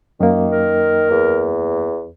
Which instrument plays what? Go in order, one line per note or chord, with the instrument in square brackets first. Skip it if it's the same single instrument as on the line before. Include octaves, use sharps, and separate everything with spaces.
[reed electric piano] F#2 A#3 [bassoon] D#3
[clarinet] A#4
[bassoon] E2